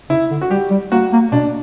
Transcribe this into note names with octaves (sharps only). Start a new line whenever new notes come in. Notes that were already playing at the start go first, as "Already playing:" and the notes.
C#3 E4
D3
F#4
G3 G4
G3
A#3 F#4
A#3
B2 D4